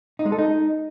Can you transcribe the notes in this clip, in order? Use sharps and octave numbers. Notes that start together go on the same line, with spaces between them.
D#4
G#3
A4
D#4